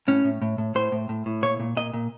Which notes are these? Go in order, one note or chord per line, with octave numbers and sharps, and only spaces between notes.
A2 C#4
A2
A2
A2
A2 C5
A2
A2
A2
A#2 C#5
A#2
A#2 D#5
A#2